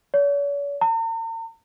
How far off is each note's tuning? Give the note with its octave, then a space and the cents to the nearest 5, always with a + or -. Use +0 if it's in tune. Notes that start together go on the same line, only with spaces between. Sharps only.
C#5 +45
A#5 -45